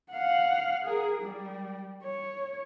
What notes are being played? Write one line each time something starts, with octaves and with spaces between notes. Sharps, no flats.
F5 F#5
G#4 A#4
G3
C#5